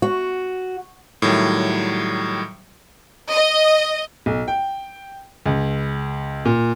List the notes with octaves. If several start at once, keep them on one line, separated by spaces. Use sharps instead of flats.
F#4
A2 D#3 F#3 G3
D#5
B1
G5
C#2
A#2